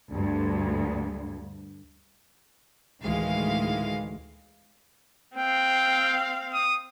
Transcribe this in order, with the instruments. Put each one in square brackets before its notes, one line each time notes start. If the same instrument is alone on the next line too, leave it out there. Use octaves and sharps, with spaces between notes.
[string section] D2 G2
D2 A2 D#3 E3 G#3 F5
[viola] C4 F5 [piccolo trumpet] G5
[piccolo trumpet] D#6